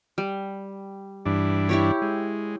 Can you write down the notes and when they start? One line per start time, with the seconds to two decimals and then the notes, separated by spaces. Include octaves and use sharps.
0.18 G3
1.26 G2 E3 D4
1.69 E4 G4 C#5
2.02 G#3